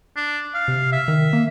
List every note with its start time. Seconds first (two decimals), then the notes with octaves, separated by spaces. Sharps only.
0.16 D4
0.55 F5
0.68 C3
0.92 E5
1.08 D#3
1.33 A#3